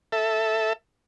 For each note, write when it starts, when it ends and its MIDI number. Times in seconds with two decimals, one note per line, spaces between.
0.12 0.73 69
0.12 0.73 76